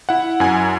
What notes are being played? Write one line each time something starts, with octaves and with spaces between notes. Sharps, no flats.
E4 F#5
F#2 G#5